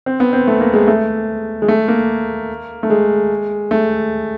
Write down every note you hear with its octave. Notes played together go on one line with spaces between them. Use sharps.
C4
B3
C4
A3
A#3
G#3
A3
G#3
A3
A#3
A3
G#3
A3